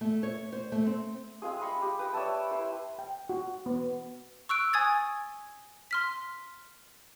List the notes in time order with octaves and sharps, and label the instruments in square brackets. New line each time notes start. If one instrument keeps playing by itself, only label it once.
[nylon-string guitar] A3
C#5
C5
A3
C4
[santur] G#3 C4 F4 G#4
D#5 F5 B5 C#6
G4
B4 G5 D#6 E6
C#5 D5 E5 A5
E4 B4 C5
[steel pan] G5
F#4
B3
[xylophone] C#6 E6 F#6 D7
G#5 D#6 G#6 A6
C6 F6 B6